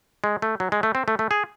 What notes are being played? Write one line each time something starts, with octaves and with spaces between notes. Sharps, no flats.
G#3
A3
F#3
G#3
A3
C4
A3
A3
G#4